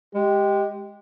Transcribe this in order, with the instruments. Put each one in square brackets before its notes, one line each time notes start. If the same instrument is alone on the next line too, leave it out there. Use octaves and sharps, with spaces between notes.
[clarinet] G#3 [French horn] G4